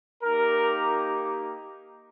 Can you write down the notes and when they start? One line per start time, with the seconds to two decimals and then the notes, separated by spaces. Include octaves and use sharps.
0.23 A#3 D#4 G4 A#4